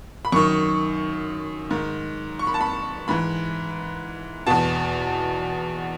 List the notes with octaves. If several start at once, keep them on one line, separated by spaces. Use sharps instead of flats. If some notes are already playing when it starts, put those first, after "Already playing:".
B5
F#2 D#3 C#6
G#2 D#3
C#6
B5
A5
B5
G#2 E3 B5
E2 B2 A5